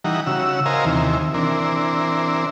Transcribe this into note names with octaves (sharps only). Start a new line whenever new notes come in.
E3 G3 D#4 F#5 A#5
C#3 F#4 E6
A#4 C5 D#5 F5 G#5 A#5
D#2 C3 E3
E3 C4 D4 A#4